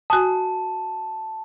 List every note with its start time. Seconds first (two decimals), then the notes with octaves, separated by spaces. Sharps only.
0.10 F#4 G#5 A5 D#6